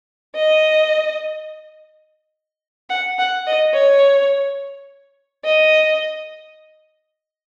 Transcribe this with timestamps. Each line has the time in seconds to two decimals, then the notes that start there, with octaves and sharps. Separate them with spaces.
0.35 D#5
2.89 F#5
3.19 F#5
3.47 D#5
3.74 C#5
5.45 D#5